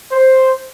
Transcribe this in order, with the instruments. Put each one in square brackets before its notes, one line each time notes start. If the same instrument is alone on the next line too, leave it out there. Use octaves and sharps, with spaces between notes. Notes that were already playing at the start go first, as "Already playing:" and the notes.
[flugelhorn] C5